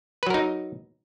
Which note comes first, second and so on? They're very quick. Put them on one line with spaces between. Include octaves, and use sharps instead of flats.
B4 F#3 A#4 D#4